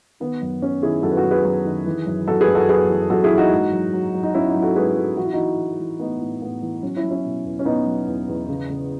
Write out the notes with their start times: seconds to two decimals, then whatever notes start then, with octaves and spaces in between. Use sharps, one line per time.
0.20 D#3 B3
0.41 F#2
0.62 F#2 C#4
0.82 D#3 E4 G#4
1.03 F#2 F#4 A4
1.11 B4
1.17 F#4 A4
1.24 F#2
1.31 G#4 B4
1.45 F#3
1.65 D#3
1.86 E3
2.06 F#2
2.27 F#2 F#4 A4
2.41 G#4 B4
2.48 F#2
2.55 F#4 A4
2.69 F#2 G#4 B4
2.89 E3
3.10 F#2 F#4 A4
3.24 E4 G#4
3.31 E3
3.38 D#4 F#4
3.52 G#2
3.72 F#3
3.93 F#3
4.14 F#3
4.23 D#4
4.34 F#3 C#4 E4
4.48 D#4 F#4
4.55 F#3
4.62 F#4 A4
4.76 G#2 G#4 B4
4.96 F#3 F#4 A4
5.17 E3 F#4
5.25 E4
5.33 E3 D#4 F#4
5.58 E3
5.79 E3
6.00 A2 B3 D#4
6.20 A2
6.42 A2 B3
6.62 E3
6.83 F#3 C#4
6.96 C#4 E4
7.03 F#3
7.11 C#4 E4
7.24 B2
7.45 E2
7.59 C#4
7.65 B2 B3 D#4
7.86 F#3
8.07 E2
8.28 E2
8.48 C#3
8.69 C#3